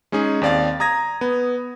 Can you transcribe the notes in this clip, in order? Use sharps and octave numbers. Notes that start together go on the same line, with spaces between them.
G#3 C#4 D#4 G#4
D#2 C4 D5 F5 A6
A#5 D#6 G#6 A#6
B3